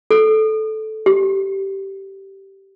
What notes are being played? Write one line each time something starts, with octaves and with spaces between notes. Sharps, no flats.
A4
G4